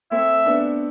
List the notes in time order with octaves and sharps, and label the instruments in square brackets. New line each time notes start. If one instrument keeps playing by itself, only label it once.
[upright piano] A3 C4 [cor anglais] E5
[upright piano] B3 D4